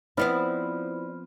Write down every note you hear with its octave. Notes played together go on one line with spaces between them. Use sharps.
F3 B3 C4 E4 D5 E5 B5 F6